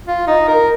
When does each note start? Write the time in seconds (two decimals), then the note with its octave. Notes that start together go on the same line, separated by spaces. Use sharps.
0.07 F4
0.27 D#4
0.48 A#4